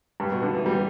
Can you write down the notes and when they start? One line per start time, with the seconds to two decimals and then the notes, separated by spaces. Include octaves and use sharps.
0.20 G2
0.32 B2
0.43 D3
0.55 E3
0.66 G3
0.73 E3